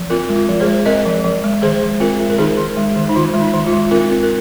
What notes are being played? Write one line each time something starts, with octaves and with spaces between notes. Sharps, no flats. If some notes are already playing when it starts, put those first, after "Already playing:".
Already playing: F3
C4 F4 A#4
G#3
F4
F3
G#4 C5
G#3
C4 A#4 D#5
F3
F3
G#3
D#3 G#4 C5
G#3
C4 F4 A#4
G#3
A#4
D#3 D#4 G#4
D#3
G#3
D#3
D#4
D#3 F4
G#3
D#4
D#3
F4
G#3
C4 F4 A#4
C4
A#4